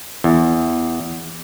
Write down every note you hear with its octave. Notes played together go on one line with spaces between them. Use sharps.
E2